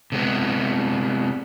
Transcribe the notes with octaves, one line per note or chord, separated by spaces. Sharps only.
C3 G#3 B3